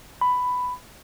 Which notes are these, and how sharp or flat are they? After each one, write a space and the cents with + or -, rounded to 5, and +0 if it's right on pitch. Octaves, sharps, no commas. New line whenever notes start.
B5 +10